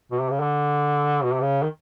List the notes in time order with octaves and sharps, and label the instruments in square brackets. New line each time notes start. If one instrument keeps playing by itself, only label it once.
[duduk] B2
C3
C#3
D3
B2
C3
C#3
D#3